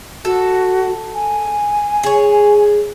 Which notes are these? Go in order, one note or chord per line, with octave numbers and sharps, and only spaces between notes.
F#4 A4
G#5
G#4 C#5